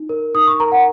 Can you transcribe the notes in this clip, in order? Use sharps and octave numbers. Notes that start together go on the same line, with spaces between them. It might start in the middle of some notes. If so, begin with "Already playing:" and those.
Already playing: D#4
A#4
D#4 D#6
C#6
A#4 A#5
F#5